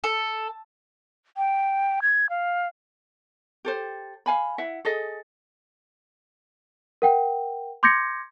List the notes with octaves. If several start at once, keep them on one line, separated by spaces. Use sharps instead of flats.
A4
G5
G#6
F5
G4 A4 C5
F5 G#5 B5
E4 E5 F#5
G#4 A4 D#5
A#4 F#5 G5
C6 D6 G6 G#6 A#6 C#7